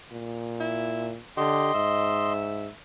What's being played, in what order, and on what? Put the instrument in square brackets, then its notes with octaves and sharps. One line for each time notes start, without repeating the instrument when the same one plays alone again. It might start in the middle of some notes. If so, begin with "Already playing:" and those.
[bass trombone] A#2
[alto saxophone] E4
[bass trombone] D3 [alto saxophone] G4 [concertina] D#5 C6
[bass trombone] G#2 [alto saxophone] E5